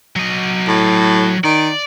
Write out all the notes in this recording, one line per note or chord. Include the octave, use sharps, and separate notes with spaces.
F#3 D#5
A2
D#3 D5